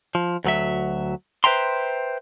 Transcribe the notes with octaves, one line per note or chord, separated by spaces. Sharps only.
F3
D2 F#3 E5
B4 C5 E5 G5 A#5 C6